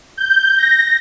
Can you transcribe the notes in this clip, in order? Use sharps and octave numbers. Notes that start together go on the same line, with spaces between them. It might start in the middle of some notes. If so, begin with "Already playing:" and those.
G6
A#6